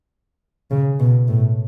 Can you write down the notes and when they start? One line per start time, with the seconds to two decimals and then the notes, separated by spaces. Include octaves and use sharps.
0.71 C#3
1.00 B2
1.28 A2